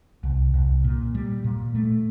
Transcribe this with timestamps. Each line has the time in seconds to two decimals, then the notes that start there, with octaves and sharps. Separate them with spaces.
0.23 C2
0.54 C2
0.84 A#2
1.15 G3
1.44 A#2
1.75 A3